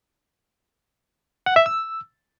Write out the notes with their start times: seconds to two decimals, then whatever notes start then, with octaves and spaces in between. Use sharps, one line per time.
1.46 F#5
1.56 E5
1.66 E6